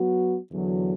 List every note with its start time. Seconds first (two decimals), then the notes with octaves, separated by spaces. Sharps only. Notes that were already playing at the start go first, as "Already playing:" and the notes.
Already playing: F#3 B3 F#4
0.51 E2 D3 F#3